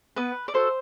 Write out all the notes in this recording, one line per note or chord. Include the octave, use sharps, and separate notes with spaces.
B3 B4
D5
F#4 A4 C5